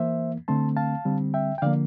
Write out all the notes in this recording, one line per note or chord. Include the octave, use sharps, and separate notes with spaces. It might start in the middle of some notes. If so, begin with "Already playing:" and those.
Already playing: E3 A#3 C5 E5
D3 A3 C4 A5 C6
F5 A5
D3 G3 C4
E5 G5
G5
D3 F3 A#3 D5 F5